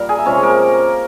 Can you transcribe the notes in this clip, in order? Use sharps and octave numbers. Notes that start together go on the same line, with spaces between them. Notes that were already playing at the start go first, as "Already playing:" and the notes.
Already playing: A#2 G3 A#4 A#5
G#4 G#5
E5
C3 F3 G#3 C#4 C#5
A#3 A#4